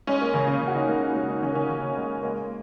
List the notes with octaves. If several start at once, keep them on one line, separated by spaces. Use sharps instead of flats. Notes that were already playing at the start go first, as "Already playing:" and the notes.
G#3 C#4
A#3
C#3 C#4
C#4
C#3
F#4
D#4
G#3 A#3
D#4
G#3
D#4
C#3 C#4
A#3
C#4
C#3
G#3
G#3 A#3